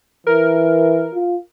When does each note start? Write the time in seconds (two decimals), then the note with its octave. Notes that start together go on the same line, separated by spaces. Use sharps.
0.27 E3 A#4
1.15 F4